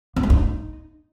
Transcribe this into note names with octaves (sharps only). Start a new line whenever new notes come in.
B3
A3
D#4